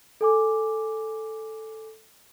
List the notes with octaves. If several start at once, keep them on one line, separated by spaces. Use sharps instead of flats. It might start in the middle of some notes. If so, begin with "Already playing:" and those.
A4 G#5 D6